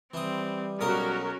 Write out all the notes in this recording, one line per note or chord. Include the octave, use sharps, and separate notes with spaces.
E3 G3 C4 D#6
B1 C#4 F#4 A#4 F5 D#6